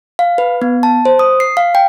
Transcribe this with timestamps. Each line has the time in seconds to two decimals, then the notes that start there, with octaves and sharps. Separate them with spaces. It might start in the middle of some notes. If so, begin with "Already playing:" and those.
0.19 F5
0.38 B4
0.62 B3
0.83 A5
1.05 C5
1.19 D#6
1.40 C7
1.57 F5
1.75 G5